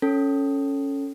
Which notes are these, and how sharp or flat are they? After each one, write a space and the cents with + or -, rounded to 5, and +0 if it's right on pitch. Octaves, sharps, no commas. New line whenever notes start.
C#4 +0 A4 +5